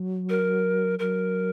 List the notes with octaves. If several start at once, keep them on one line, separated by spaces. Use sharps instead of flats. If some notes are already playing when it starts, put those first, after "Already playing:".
Already playing: F#3
A#4
F#3 A#4